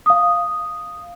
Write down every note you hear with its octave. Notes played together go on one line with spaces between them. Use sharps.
F5 D#6